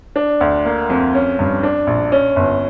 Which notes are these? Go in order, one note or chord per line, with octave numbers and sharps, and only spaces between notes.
D4
D2
A#3
F2
C#4
G2
D4
A#1
C#4
G1